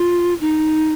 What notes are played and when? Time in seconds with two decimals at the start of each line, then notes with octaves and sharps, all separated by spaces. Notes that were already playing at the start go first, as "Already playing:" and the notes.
Already playing: F4
0.41 D#4